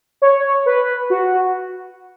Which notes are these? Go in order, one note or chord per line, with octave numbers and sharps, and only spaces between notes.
C#5
B4
F#4